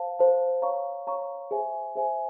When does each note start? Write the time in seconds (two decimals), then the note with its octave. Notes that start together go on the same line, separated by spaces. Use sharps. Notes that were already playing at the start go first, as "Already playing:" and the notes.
Already playing: C5 F5 A5
0.19 C5 F5 A5
0.62 C#5 F5 A#5 C#6
1.07 C#5 F5 A#5 C#6
1.51 G#4 C5 E5 G#5
1.95 G#4 C5 E5 G#5